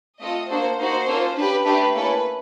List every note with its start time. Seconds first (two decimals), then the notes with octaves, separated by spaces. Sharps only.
0.21 A3 C4 F4 A4 D#5
0.49 A#3 D4 F#4 A4 C5
0.78 A#3 D#4 F#4 C5
1.07 A#3 C#4 F4 A4
1.36 D4 G4 B4
1.66 A3 D4 G4 B4
1.94 A#3 C#4 E4 A4 B4